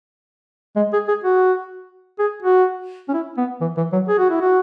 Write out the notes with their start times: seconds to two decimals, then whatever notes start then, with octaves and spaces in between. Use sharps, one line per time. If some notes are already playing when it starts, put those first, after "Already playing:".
0.76 G#3
0.93 G#4
1.08 G#4
1.24 F#4
2.19 G#4
2.42 F#4
3.08 C#4
3.14 E4
3.37 B3
3.61 E3
3.77 E3
3.92 F#3
4.08 G#4
4.18 F#4
4.30 E4
4.41 F#4